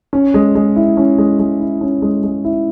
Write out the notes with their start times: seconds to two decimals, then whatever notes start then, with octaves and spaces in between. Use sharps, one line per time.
0.13 C#4
0.34 G#3
0.55 G#3
0.76 E4
0.97 C#4
1.18 G#3
1.39 G#3
1.60 E4
1.81 C#4
2.02 G#3
2.23 G#3
2.45 E4